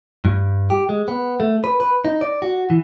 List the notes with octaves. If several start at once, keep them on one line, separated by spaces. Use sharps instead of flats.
G2
G4
G#3
B3
A3
B4
B4
D#4
D5
F#4
E3